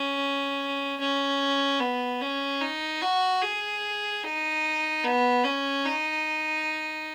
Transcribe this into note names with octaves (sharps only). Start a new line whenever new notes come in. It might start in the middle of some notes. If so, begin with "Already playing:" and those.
Already playing: C#4
C#4
B3
C#4
D#4
F#4
G#4
D#4
B3
C#4
D#4